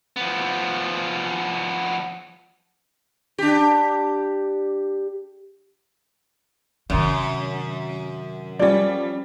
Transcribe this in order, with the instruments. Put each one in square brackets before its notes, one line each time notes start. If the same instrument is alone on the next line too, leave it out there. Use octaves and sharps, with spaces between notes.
[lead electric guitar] F3 B3
[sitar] D4 G4
[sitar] F#2 [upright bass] C3 D#3
[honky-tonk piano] F3 G3 [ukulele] C#4 D5